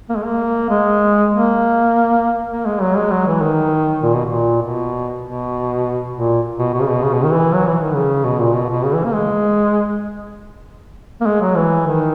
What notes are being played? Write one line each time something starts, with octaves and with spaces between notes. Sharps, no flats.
A#3
G#3
A#3
G#3
A#3
A#3
G#3
F#3
G#3
F#3
E3
D#3
A#2
B2
A#2
B2
B2
A#2
B2
B2
C#3
B2
C#3
B2
D#3
E3
F#3
E3
D#3
C#3
B2
A#2
B2
B2
C#3
E3
A#3
G#3
A#3
G#3
F#3
E3
D#3